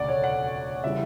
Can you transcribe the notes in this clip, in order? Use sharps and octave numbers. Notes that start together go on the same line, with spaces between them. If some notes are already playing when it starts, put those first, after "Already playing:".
Already playing: E1 D2 C#3 D5 F#5
C#5
F#5
C#3 E3 G3 E5